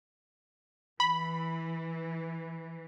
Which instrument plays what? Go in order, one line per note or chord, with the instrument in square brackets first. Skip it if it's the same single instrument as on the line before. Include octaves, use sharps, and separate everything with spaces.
[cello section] E3 [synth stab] B5